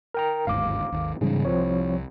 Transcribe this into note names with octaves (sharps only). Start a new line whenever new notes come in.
A#4 G5 A#5
G1 D#2 G#2 F5 D6
G#1 D#2
G#2 C#3 E3 G3 C#4
C2 F3 C4 C#5